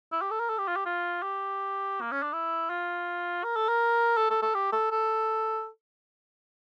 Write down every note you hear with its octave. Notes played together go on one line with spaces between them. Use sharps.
E4
G4
A4
A#4
A4
G4
F4
G4
F4
G4
A#3
C#4
D4
E4
F4
A#4
A4
A#4
A4
A4
A4
G4
A4
A4